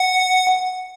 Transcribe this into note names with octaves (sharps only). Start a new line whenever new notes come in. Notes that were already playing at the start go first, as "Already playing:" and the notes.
Already playing: F#5